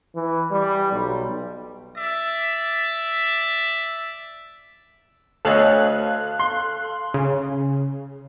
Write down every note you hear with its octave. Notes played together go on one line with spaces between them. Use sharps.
E3
G3
B1
D5 E5
D2 A4 C#5 D#5 F5 F#6
C6
C#3